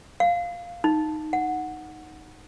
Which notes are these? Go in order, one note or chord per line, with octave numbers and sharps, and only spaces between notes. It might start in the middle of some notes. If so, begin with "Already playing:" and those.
F5
D#4
F#5